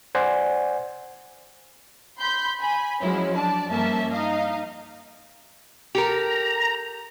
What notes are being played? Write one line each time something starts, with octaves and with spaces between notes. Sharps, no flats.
C5 D5 F#5 G#5
B5 C6 G6 B6
G#5 B5
F3 F#3 G#3 C#4 E4 C#5
D4 D5 A5
G2 F3 A#3 C#4 E5 A5
D#4 D#5 F5
G4 A4 A#4 A#5